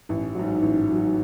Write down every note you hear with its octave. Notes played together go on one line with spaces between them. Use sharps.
A1
G#2 F#3
A1
G#2 F#3